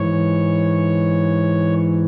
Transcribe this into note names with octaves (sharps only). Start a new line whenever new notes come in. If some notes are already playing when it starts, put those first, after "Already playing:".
Already playing: G#2 E3 C#5